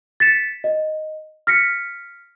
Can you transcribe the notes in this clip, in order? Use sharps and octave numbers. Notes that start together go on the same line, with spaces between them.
A6 B6 C#7 E7
D#5
F6 A#6 B6 C#7